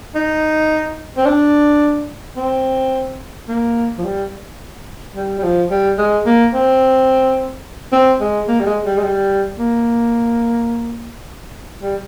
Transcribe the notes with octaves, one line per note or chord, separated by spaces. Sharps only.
D#4
C4
D4
C4
A#3
F3
G3
G3
G3
F3
G3
G#3
A#3
C4
C4
G#3
A#3
G3
G#3
G3
G#3
G3
A#3
G3